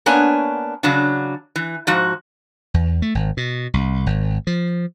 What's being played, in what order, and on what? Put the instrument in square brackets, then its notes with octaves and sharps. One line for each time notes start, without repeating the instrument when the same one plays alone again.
[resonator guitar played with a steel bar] A#3 B3 D4 C#5 G#5
C#3 F#3 D4
E3
G#2 F3 F#4
[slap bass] E2
A3
G#1
B2
C2
G#1
F3